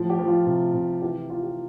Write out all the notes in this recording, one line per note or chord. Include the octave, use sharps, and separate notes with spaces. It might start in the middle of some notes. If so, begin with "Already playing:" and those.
Already playing: A2 F3
G4
F3
F4
C3
C3
E3 G4
E3 F4
G4